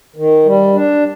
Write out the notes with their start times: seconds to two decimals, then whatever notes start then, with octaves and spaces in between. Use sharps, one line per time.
0.16 D#3
0.46 G3
0.73 D4